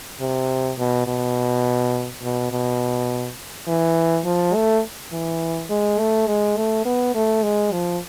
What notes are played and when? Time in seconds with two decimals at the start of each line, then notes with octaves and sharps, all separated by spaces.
0.20 C3
0.78 B2
1.07 B2
2.23 B2
2.52 B2
3.68 E3
4.25 F3
4.55 A3
5.12 E3
5.70 G#3
5.99 A3
6.27 G#3
6.57 A3
6.85 B3
7.15 A3
7.43 G#3
7.72 F3